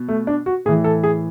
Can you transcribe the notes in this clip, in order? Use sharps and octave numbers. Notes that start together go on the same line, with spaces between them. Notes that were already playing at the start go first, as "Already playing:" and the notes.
Already playing: B2
A3
D4
F#4
A2 E3 G#4
A4
G#4